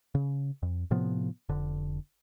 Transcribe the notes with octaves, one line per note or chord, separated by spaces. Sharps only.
C#3
F2
A2 C3 F3 B3
F1 D3